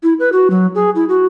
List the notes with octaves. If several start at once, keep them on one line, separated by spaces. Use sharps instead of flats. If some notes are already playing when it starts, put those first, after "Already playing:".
E4
B4
F#4
F#3
G#4
E4
F#4